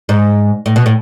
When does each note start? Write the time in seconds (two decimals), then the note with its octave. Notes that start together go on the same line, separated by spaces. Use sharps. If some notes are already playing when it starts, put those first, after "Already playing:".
0.09 G#2
0.66 A2
0.76 B2
0.86 A2